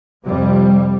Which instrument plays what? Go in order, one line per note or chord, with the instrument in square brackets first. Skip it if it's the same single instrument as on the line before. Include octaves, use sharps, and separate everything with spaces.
[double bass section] F2 C3 G3